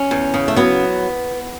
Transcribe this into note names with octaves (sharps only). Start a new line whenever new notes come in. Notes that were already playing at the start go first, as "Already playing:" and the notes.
Already playing: C#4
E2
C#3
A3
F#3 B3